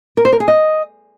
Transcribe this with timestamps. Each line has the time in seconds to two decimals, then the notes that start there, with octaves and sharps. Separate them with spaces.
0.17 A#4
0.25 C5
0.33 A#4
0.40 G#4
0.48 D#5